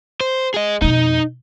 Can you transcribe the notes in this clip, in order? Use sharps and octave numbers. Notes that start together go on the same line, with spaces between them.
C5
G#4 D#5
F2 B2 D#4